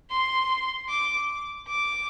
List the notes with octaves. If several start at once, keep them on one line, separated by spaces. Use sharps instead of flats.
C6
D6
D6